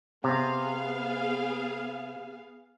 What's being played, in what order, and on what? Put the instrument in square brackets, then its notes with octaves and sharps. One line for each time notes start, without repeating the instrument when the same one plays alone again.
[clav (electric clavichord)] C3 [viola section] B3 G#4 F5